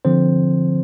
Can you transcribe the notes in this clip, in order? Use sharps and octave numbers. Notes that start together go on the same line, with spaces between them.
D3 F3 C4 C5